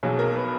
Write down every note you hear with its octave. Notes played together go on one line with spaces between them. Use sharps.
B1 B2 F#3 G#4
A#4
B4